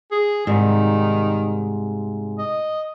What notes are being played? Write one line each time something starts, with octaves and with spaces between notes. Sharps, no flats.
G#4
G#2 C3 D#3 G3
D#5